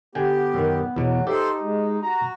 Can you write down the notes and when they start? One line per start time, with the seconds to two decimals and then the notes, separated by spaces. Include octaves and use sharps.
0.15 D3 B3 G4 G5 G#5
0.54 F#2 D#3
0.96 E2 B2 F#3
1.27 D#4 G4 A4 C5 D5 E5
1.61 G#3
2.02 F#4 A#5